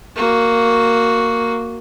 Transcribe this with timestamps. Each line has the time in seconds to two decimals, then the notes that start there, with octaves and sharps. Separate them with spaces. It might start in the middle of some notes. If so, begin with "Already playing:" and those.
0.16 A#3 F#4